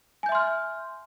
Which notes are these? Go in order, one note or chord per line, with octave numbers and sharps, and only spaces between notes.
E5 G#5 C6 F6 G6